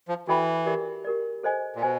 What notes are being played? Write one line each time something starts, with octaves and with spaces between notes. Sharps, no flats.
F3
E3 F#4 A4 D5 G5 B5
G4 A#4 D5
G4 A#4 D5
A4 C5 D#5 G#5
A#2
B2 C5 D#5 G#5